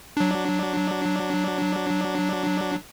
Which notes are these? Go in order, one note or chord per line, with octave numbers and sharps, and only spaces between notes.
F#3 D4